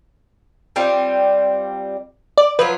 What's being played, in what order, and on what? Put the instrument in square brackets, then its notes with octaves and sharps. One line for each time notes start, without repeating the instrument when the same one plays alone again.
[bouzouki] G3 C4 F4
[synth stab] D5
[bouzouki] F3 F#3 F4 [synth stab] B4